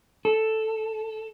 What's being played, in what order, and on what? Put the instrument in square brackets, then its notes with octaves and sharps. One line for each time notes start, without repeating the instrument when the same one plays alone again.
[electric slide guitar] A4